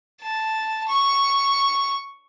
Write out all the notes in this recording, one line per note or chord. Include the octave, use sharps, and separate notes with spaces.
A5
C#6